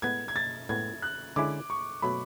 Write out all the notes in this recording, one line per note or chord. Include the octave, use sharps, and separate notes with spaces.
A2 G#3 B3 G#6
G#6
A6
A2 G#3 B3 G#6
F#6
D3 G#3 C#4 E4 G#4 D6
C#6
B2 F#3 A3 B5